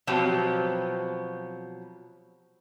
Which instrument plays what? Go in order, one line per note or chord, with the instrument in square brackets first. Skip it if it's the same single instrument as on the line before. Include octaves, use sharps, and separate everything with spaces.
[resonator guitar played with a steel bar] B2 F3 F#3 C4 G4